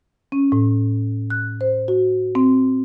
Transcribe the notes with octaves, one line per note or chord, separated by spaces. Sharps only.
C#4
A2
F#6
C5
F#4
C4